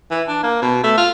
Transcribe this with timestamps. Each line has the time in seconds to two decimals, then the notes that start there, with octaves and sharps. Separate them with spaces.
0.11 E3
0.28 D4
0.43 A#3
0.62 B2
0.84 A3
0.97 F4